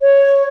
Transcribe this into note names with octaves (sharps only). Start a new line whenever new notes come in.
C#5